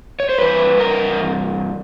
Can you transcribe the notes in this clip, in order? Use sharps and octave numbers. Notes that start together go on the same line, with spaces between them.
C#5
C5
G2 E3 B4
A#4